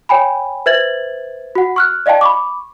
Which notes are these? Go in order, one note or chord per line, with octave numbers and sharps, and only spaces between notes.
C#5 G5 G#5 B5
B4 C5 E5 G#6 A6 F#7
F#4 F#5
C#6 F6 F#6
D5 D#5 F5 G5 A5
B5 C#6 D6